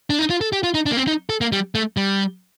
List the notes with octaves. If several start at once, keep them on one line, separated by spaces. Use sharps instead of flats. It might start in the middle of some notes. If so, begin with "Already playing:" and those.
D4
D#4
F4
A4
G4
F4
D#4
D4
A#3
C4
D#4
A4
A#3
G3
A3
G3